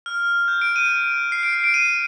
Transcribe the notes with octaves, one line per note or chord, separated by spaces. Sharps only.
F6
G6
D7
D#7
C7
D7
C7
D7
D#7